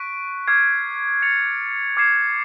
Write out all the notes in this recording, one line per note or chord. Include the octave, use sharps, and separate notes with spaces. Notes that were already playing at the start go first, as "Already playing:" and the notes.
Already playing: C#6 F#6 B6 D7
D6 F6 G#6 C7
A6 C#7 F7
D6 F6 G#6 C7 E7